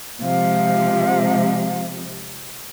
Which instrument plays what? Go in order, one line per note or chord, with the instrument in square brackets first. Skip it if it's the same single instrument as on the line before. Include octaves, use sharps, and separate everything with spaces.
[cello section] C3 F3 G#3 [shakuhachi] F5